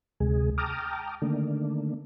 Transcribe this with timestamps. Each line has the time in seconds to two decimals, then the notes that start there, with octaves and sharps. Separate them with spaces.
0.20 D2 C3 G#3 G#4
0.58 G5 A5 A#5 D6 D#6 F6
1.22 D3 D#3 A3 A#3 D4